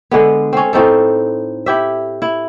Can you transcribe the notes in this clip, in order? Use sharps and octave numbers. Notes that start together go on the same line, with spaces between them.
D3 G#3 B3
C4 C#4
A2 C4 D#4 A4
E4 G4 E5
E4